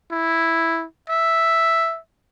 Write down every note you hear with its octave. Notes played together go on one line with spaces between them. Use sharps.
E4
E5